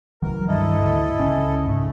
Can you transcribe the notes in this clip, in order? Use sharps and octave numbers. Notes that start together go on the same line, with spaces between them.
C#2 E3 F#3 A#4
G2 D#3 E4 A4 D#5
D2 G#2
C#2 C#3 C#4
G#2 C#3 A3